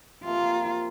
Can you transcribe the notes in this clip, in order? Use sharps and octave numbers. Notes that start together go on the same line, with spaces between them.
C3 F3 A#3 F4